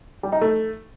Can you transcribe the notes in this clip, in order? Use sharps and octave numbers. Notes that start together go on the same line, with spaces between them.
G3
D#4
A3